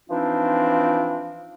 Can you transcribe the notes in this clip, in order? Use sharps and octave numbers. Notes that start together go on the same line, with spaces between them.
E3 F3 C4 D4 D#4 F4